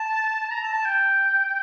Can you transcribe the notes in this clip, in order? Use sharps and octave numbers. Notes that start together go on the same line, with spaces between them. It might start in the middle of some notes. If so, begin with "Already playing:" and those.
Already playing: A5
A#5
A5
A5
G5